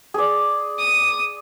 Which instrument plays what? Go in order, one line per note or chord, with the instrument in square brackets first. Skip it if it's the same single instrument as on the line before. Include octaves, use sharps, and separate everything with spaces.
[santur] G#4 D5
[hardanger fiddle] D#6